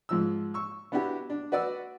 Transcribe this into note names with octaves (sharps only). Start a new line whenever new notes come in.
G#2 F3 E6
C#6 E6
B3 D4 E4 F#4 G4
D4
F#4 B4 D5 F#5 E6